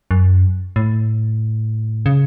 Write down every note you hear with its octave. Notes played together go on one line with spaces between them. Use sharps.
F#2
A2
C#3